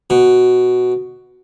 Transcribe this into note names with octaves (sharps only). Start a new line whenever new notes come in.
B2